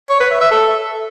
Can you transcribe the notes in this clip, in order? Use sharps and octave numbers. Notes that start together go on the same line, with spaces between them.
C#5
B4
E5
E5
A4